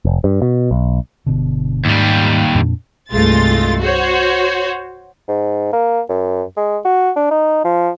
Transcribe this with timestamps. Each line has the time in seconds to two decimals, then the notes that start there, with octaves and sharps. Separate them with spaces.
0.05 F1
0.24 G2
0.42 B2
0.71 B1
1.26 G1 B2 D3
1.85 D#2 G#2 G3
2.55 F2 A#2 D4
3.11 C2 G2 G#3 A3 F4 A6
3.79 F#4 C5 C#5
5.28 G#2
5.73 A#3
6.09 F#2
6.57 G#3
6.85 F#4
7.16 D4
7.31 D#4
7.64 F3